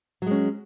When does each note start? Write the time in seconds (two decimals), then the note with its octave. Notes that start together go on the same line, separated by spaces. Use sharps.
0.22 F#3
0.26 G#3
0.31 C#4